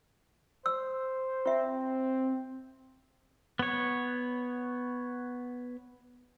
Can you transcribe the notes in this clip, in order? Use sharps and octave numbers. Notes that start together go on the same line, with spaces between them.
C5 E6
C4 F4 E5
B3 C#5